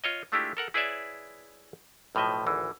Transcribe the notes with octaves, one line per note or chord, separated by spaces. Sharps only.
F4 C#5 D#5
G#3 A3 D4 E4 F4 G4
A4 A#4 F#5
E4 G#4 B4 C#5 D5 E5
B1 A2 F3 D#5 E5
G#1 D2 E3